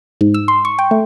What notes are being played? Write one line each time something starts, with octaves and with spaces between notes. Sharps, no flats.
G#2
E6
C6
C#6
G5
A3